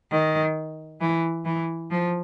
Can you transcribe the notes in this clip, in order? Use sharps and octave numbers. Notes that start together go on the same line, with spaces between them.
D#3
E3
E3
F3